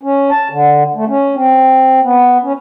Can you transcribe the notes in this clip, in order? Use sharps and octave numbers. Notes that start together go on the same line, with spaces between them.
C#4
A5
D3
A3
C#4
C4
B3
C#4